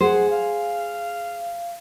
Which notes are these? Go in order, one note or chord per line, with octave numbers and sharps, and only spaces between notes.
G#4 C5 F#5
F5